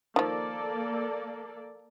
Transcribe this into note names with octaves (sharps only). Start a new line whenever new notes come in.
D#3 F3 A#3 A4 D5